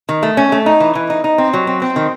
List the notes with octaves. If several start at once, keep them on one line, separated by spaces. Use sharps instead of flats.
D#3
A3
C#4
A3
D#4
E3
E3
D#4
D#4
C4
F#3
C4
C4
D#3